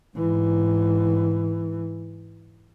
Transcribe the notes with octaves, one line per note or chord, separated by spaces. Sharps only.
G#2 E3